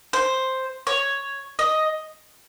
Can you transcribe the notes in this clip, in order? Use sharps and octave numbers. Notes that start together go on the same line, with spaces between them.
C5
C#5
D#5